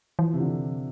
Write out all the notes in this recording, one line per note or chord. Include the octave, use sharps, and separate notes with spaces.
E3 F3
C3
D3